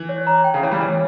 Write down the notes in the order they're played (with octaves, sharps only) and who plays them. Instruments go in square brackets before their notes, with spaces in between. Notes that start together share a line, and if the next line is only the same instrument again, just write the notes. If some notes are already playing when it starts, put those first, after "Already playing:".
Already playing: [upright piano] E3
[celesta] C#5
A#5
G5
[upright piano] C#3
[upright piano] E3 [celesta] C#5
[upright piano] G3
[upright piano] E3 [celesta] C#5